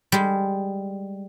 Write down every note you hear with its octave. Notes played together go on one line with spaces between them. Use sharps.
G3 G#3